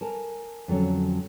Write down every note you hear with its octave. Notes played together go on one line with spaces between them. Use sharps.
A#4 G#5 A5
F2 D3 F#3 C#4